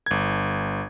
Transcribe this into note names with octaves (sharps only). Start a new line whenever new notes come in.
G1 G#6